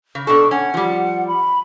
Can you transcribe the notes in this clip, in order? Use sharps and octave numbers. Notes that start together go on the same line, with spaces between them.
C#3
B2 D4 A4 C#6
C#4 F#5
F3 G3
B5